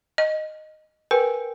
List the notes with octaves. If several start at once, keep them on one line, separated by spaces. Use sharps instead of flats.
D#5
A#4 B4 G5 G#5